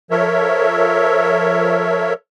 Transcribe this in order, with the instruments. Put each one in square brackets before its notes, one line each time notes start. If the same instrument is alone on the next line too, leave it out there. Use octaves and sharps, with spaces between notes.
[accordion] F3 A4 A#4 C#5 E5